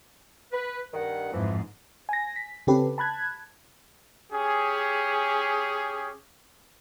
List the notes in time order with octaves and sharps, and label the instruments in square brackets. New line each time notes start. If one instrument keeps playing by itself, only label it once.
[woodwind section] B4
G2 D#3 F#5
[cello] F2 G#2 [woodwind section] E3 F3
[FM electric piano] G#5 A#6
B6
C#3 C4 C#4 G4 A4 B4
A5 B5 F#6 G#6
[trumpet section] C#4 G4 G#4